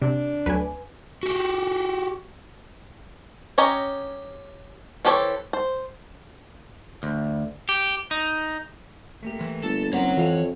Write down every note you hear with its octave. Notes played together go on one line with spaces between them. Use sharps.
C3 D4
D2 F#3 A3 B4 G#5
F#4 G4
C#4 G4 C#5 D#5 A#5
E3 G4 A4 C5 C#5
C5
D2
G4
D#4
A3 A#3 G4
E3
G1 A4
F#1 C4 C#4 A#4 C#5 F#5
F2 E3 F5